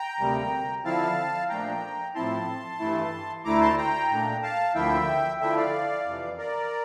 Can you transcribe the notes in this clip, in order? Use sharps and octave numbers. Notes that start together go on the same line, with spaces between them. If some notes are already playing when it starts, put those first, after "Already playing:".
Already playing: G5 A#5
D2 C3 G3 A#3
D3 F3 C4 E4 F5 A5
A#2 F3 A3 D4 G5 A#5
A2 F3 C4 E4 A5 C6
G2 E3 A3 E4
D2 D3 A3 E4 A#5 D6
A5 C6
G5 A#5
A#2 A3 D4
F5 A5
D2 D3 F3 A#3 E4 E5 G5
D3 F3 A3 E4 E5 G5
D5 F5
F2 C3 E3
A#4 D5